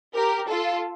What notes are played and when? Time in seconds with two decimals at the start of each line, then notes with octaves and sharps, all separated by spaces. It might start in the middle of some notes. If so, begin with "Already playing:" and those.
0.14 G4 A#4
0.49 F4 A4